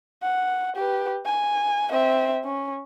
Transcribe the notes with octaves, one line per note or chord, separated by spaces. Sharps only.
F#5
G4 B4
G#5
C4 E5
C#4